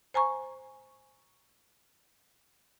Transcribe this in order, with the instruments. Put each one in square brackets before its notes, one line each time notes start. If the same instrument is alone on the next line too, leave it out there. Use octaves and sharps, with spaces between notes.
[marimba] C5 G#5 A#5 C#6